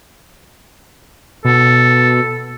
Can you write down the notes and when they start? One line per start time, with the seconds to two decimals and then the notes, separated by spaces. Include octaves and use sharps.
1.45 B2 A4